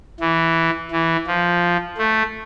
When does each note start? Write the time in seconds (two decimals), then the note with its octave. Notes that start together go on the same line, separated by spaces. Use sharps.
0.20 E3
0.91 E3
1.27 F3
1.98 A3